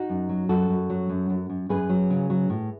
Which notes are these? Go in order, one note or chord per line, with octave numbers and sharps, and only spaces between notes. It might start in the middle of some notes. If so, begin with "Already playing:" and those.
Already playing: D#4 F#4
F#2
F#3
F#2 F#4 A4
F#2
F#3
F#2
F#2
F#2
F#2 G#4 B4
F#3
C#3
F#3
A2